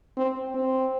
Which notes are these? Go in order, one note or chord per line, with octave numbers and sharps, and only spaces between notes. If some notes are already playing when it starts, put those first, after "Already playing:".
C4
C4